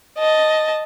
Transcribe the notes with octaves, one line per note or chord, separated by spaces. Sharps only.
D#5 A5